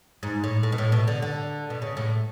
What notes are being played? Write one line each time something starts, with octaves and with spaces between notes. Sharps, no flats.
G#2
A2
A2
B2
A2
B2
D3
D3
B2
C#3
A2